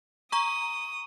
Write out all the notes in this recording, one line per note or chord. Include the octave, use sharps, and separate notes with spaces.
A#5 C#6 D#6